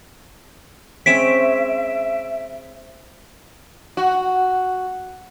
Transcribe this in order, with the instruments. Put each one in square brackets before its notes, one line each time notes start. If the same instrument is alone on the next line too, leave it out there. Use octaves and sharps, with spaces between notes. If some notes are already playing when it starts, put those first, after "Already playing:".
[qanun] G#3 C4 C#4 [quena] E5 [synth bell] B6 D7 E7
[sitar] F#4